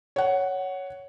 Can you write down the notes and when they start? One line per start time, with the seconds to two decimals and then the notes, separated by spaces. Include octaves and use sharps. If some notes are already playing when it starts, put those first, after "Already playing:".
0.16 C#5 F#5